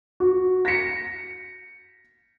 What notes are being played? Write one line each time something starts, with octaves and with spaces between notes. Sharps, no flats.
F#4
A#6 B6 C#7